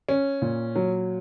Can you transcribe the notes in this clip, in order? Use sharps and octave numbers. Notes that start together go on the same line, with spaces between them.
C#4
A#2
F#3